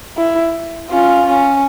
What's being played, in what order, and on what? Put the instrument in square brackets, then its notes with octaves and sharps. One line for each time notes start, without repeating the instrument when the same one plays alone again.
[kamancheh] E4
[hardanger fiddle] C#4 [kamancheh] F4
[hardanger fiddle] C#4